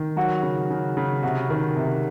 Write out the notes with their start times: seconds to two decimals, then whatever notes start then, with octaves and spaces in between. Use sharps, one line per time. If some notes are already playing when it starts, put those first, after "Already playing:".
Already playing: D#3
0.17 F#3 F#4
0.43 C#3
0.70 C#3
0.97 C#3
1.23 C3 F#4
1.50 D#3
1.77 C3